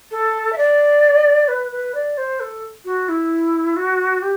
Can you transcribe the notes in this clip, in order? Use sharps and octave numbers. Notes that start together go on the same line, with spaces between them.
A4
E5
D5
B4
B4
D5
C5
A4
F#4
E4
F#4
G4